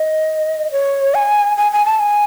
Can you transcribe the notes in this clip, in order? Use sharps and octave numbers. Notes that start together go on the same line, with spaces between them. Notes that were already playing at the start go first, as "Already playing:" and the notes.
Already playing: D#5
C#5
G#5
G#5
G#5
A5
G#5